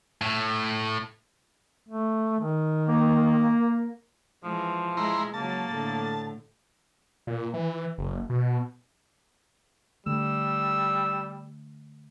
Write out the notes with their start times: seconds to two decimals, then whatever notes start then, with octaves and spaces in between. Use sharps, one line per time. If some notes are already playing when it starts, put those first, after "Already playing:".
0.22 A2
1.89 A3
2.40 D#3
2.89 A#3
4.44 E3 F3 G#3
4.97 G#3 E4 A#5 C6
5.34 C#3 F#3 A#3 A5
5.71 A2 D3
7.27 A#2
7.54 E3
7.98 F#1
8.30 B2
10.06 D3 G3 A3 E6